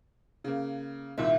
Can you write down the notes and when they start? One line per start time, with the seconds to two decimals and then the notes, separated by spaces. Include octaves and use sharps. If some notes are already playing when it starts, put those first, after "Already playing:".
0.44 C#3 A#3
1.18 C2 A#2 D#3 E5